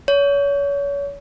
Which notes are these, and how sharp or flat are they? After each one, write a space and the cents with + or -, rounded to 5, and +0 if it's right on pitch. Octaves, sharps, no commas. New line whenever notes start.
C#5 +35